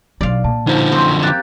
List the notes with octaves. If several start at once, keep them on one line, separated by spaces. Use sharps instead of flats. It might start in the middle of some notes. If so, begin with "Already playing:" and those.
B1 F#3 D5 F5
A#2 A5
D3 F3 D#4 E4 C5
F#2 C4
A#3 G4 F#6 A6